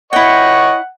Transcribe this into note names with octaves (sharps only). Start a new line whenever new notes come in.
E4 C#5 D#5 F#5 G5 C#6